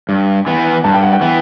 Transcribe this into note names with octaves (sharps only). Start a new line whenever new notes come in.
G2
E3 B3
G2 A5
G5
F#5
G5
E3 B3